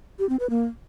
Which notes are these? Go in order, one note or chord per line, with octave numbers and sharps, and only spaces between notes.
G4
C4
B4
A#3